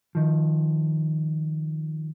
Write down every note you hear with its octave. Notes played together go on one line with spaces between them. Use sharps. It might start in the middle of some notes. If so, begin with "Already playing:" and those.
D#3 F3